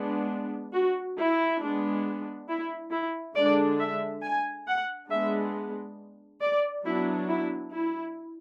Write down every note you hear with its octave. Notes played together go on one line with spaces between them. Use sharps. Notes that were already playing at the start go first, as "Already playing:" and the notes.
Already playing: G#3 B3 D4
F#4
E4
G#3 B3 D4
E4
E4
D3 G#3 D4 D5
E5
G#5
F#5
G#3 B3 D4 E5
D5
F#3 B3 D4 E4
E4
E4